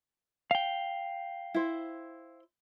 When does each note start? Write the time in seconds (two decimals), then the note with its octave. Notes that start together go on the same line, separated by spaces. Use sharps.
0.51 F5 G5
1.54 E4 C5